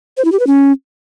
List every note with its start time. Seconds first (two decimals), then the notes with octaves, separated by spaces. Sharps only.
0.17 C5
0.25 E4
0.32 G4
0.40 B4
0.47 C#4